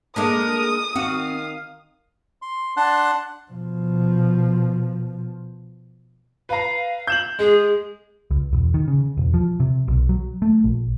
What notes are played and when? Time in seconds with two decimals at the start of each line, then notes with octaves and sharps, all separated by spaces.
0.16 G#3 A#3 D4 A4 A#4 D#6
0.96 D#3 C4 F#4 F5
2.42 C6
2.77 D4 F#5 A5 C6 F#6
3.51 B2 F3
6.49 B4 F5 A#5
7.07 G6 E7 F#7
7.39 G#3 G#4
8.31 C#2
8.53 E1
8.74 D#3
8.88 C#3
9.17 E1
9.34 F3
9.60 C3
9.88 B1
10.09 F#3
10.42 A3
10.64 A#1